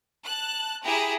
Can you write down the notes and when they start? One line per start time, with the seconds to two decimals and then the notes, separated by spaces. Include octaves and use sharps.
0.25 A5 F#6
0.84 E4 G4 G#4 A#5